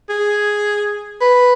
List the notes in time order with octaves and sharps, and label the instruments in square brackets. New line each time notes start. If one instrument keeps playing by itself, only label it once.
[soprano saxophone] G#4
B4